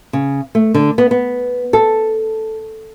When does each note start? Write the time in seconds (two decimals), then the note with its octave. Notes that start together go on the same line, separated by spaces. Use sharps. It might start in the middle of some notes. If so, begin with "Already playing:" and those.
0.13 C#3
0.55 A3
0.74 D3
0.98 B3
1.11 B3
1.73 A4